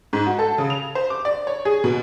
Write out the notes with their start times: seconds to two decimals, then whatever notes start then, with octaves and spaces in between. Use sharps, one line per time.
0.13 G#2
0.27 F#4
0.39 A4
0.58 C#3
0.70 F7
0.95 C5
1.10 D6
1.25 D5
1.47 C#5
1.65 G#4
1.84 B2